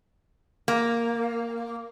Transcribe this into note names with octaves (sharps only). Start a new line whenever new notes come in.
A#3